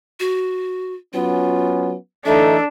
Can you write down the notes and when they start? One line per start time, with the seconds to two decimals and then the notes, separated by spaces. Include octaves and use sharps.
0.20 F#4
1.13 F#3 B3 C#4 F4
2.25 E3 A3 D4 D#4 A4 E5